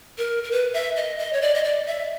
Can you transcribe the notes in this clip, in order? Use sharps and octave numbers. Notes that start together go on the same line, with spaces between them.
A#4
A#4
B4
E5
D#5
D#5
C#5
D5
D#5
D5
E5